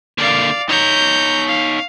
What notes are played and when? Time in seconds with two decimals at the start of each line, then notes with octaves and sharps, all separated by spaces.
0.18 D3 A#3 D5 F5
0.69 D#4 C#5 A#5 G6
1.47 F5